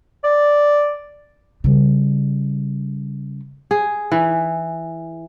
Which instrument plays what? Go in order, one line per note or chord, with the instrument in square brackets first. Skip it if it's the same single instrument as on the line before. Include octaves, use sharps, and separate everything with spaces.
[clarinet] D5
[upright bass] C#3 G3
[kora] G#4
E3